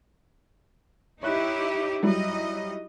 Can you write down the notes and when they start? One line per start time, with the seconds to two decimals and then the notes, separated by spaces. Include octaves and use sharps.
1.23 D#4 E4 G4 C#5 F#6
2.03 F#3 G3 D#4 E4 D#5